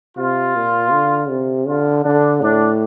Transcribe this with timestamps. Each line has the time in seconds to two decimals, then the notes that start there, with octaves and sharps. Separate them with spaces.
0.18 C3 F4
0.56 A#2
0.92 D3
1.29 C3
1.68 D3 F4
2.04 D3 D4
2.42 A2 D4